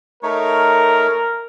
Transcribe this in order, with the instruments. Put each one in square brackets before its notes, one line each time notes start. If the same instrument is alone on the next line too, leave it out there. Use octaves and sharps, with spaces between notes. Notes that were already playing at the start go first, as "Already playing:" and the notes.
[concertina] A3 D#4 C#5 [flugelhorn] A#4